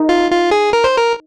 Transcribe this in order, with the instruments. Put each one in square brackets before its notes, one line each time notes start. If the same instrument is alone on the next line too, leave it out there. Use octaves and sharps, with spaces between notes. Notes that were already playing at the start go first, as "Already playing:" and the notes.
Already playing: [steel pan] D#4
[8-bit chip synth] F4
F4
G#4
A#4
C5
A#4